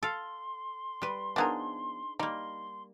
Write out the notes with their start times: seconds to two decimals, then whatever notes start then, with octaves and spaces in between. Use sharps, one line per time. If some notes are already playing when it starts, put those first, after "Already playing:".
0.03 A4 F5 C6
1.02 G3 B4
1.36 F3 B3 D4 D#4 G#4 A#4
2.19 G3 A#3 D#4 C6